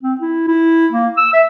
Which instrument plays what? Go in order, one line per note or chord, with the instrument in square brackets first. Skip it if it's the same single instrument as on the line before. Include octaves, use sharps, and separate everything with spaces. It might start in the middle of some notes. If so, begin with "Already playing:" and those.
[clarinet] C4
E4
E4
A#3
E6
E5